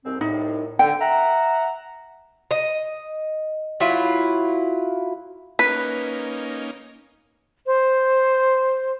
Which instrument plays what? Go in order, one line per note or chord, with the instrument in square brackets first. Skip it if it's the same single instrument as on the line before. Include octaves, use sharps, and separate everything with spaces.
[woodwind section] C2 G#2 C4
[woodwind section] C2 A2 [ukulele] D#4
[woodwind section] D3 [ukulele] G5
[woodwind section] E5 F#5 A#5
[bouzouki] D#5
F#3 E4 F4
[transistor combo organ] A#3 C#4 D#4 [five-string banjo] B4 [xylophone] B6
[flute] C5